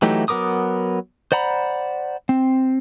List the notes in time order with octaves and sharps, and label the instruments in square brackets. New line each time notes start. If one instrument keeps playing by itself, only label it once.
[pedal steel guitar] E3 F#3 A3 D#4 G4
F#3 B3 A#4 D6 D#6
C5 D5 F#5 A#5 B5
C4